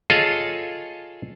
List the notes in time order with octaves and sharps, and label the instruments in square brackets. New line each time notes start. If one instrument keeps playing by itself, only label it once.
[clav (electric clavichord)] F4 G#4 A4 C#5 D#5 F5